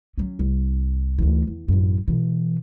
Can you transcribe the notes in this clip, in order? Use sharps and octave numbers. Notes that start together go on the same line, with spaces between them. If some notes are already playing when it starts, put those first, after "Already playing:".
F#3 C#4
C2
D2 E3
E2
A1 F#2
B2 E3